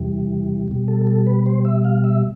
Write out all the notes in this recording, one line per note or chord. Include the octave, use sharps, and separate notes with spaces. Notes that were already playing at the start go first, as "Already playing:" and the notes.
Already playing: E2 C3 E3 G3
B2 G3
A4
A4
B4
C5
E5
F5
E5